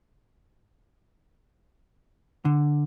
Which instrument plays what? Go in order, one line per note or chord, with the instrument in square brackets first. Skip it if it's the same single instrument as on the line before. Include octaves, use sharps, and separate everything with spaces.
[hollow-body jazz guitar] D3